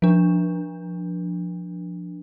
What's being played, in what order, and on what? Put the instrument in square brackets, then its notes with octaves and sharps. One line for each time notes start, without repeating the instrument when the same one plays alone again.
[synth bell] F3 D4